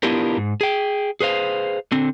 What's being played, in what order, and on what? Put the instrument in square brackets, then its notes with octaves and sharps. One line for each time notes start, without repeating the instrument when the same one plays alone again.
[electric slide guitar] B3 D4 E4 F4 G4 A#4
G#2
G#4 G5
G#4 B4 C5 F5
D3 C4